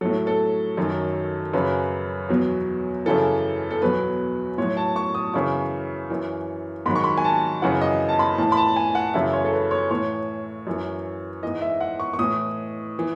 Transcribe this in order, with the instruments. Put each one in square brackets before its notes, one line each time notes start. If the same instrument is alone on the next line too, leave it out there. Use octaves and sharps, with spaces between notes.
[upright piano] A2 F#3 A4
A4
F#2 D#3 F#3
F#2 C#3 F#3 B4
E2 B2 F#3
F#2 C#3 E3 A4
A4
E2 B2 F#3 B4
A2 F#3 C#5
A5
C#6
D#6
F#2 C#3 E3 C#6
F#2 E3
G#2 D#3 F#3 B5
C#6
B5
G#5
A5
F#2 C#3 E3 F#5
D#5
A5
B5
A2 E3 A5
B5
A5
G#5
F#5
F#2 C#3 E3 E5
C#5
A4
B4
C#5
A2 E3 C#5
F#2 E3
G#2 E3 D#5
E5
F#5
C#6
C#6
A2 E3 D#6
E3